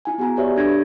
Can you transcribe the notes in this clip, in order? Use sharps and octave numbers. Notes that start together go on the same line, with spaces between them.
E4 G#5
B3 F#4 G#4 G#5 A#5
F#4 G4 B4 C#5 D5 E5
D4 G4 A4 G#6 A#6